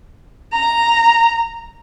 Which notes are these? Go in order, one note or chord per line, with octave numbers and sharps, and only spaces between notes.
A#5